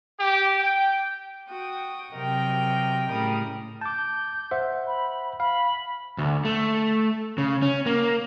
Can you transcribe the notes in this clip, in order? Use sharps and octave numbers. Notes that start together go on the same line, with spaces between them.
G4
G5
F#4 G5 D#6
C3 F#3 A#4 D#5 G5
A2 C#3 G3 A#4 D#6
A5 D6 G6
C5 E5 F#5
B5
F5 B5
D2
A3
C#3
C#4
A#3